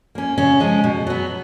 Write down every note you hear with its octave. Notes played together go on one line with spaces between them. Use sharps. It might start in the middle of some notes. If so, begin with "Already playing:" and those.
A#3 C#4
C#3 C#4
F3 G#3 C#4
B2
F#3 B3